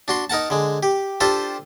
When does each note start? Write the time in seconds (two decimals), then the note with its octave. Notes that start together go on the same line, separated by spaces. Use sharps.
0.08 D4 F#4 C6
0.30 D#4 A#4 F#5 A5
0.50 D3 G#3
0.83 G4
1.20 D4 F4 G4 A4 C5